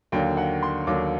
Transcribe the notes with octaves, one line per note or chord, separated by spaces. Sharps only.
D#2 D3 F#3 A#3 G5
F#5
C6
D#2 D3 F#3 A#3 D6